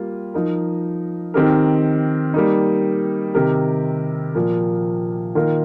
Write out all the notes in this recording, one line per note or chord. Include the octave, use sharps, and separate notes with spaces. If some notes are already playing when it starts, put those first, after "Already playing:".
Already playing: G3 A#3 F4
F3 D#4 A#4
D#3 C4 D#4 G4 A#4
G3 A#3 D#4
C3 D#3 C4 G4 A#4
A#2 F3 A#3
D#3 A#3 F4 A#4